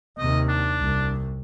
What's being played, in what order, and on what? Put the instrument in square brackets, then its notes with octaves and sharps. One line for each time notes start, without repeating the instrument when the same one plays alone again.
[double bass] D#2 C3 [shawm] D#5
[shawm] D4
[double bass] C2